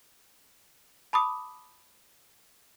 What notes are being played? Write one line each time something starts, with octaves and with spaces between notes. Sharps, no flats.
A5 B5 D6 D#6